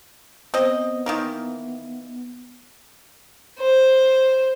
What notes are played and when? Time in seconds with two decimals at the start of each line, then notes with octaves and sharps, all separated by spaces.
0.54 B3 C4 D#5
1.06 D#3 E3 A#3
3.59 C5